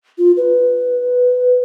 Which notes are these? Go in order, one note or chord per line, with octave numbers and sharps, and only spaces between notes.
F4
B4